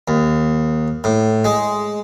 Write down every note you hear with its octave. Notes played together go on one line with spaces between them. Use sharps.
D#2
A2
G#3